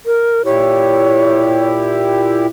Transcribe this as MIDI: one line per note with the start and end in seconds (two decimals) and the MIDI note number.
0.06 0.42 70
0.45 2.47 46
0.45 2.47 64
0.45 2.47 67
0.45 1.70 73